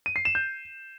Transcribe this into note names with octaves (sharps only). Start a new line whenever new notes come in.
D#7
C7
E7
G6